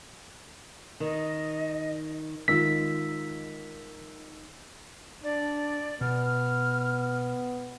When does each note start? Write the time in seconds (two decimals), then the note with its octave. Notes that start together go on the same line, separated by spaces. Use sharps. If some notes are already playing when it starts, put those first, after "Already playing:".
1.00 D#3 D#5
2.48 D#3 G#3 F4 E6 B6
5.23 D4 D5
6.01 B2 B3 F6